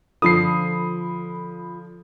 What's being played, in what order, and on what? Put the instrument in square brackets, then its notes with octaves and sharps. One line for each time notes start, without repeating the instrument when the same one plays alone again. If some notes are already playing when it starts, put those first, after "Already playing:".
[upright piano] D3 F3 [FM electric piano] F4 A4 B5 [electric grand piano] D#6 C7